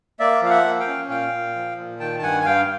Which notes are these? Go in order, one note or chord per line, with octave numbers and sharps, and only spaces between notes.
A#3 D5 E5
F3 F5
E5 F#5
A#3
F5 G5
C#4
A#2 F5 G5
A#2
F3
A#2
D#3 G5 A5
A5
G2 F#5 G#5
G#5
G2 F5 G5